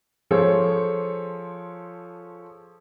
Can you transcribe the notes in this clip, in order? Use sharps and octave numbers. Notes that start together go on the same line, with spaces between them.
F3 G#4 A4 C5 C#5